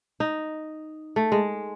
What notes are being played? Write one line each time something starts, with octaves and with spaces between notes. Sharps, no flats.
D#4
A3
G#3